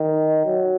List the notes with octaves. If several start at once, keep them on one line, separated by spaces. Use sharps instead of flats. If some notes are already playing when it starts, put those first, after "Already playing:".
Already playing: D#3
F#3